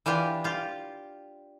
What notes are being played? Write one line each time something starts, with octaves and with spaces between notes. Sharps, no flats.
E3 D4 F4 G4
F4 G4